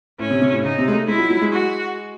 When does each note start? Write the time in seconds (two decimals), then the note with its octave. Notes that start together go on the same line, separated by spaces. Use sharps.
0.19 A2 C#4
0.31 C3
0.42 C3
0.53 A2
0.63 C#3 D#4
0.78 C3
0.88 G#3
0.92 A3
1.08 G#3 E4
1.18 F#3
1.30 F#3
1.41 G#3
1.52 F#4